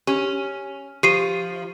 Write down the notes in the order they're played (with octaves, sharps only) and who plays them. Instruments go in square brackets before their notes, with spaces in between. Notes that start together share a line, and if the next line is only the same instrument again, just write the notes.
[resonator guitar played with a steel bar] C#4 [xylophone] G4
[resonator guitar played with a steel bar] F3 [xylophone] G4 C7 D#7